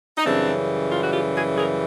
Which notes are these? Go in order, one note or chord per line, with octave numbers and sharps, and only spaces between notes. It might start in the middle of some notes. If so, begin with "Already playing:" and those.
D#4
F#2 C#3 E3 G3 C4 D4
F4
F#4
F4 G4
F#4 G#4
G#4 A#4